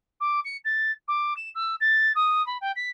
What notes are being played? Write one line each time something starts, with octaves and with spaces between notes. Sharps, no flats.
D6
C#7
A6
D6
E7
E6
A6
D#6
B5
G5
B6